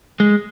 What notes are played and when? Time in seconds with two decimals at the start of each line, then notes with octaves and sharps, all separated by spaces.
0.20 G#3